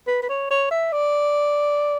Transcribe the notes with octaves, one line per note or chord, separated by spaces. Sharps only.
B4
B4
C#5
C#5
E5
D5